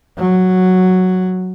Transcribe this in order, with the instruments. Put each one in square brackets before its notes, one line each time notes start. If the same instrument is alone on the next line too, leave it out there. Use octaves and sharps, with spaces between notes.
[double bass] F#3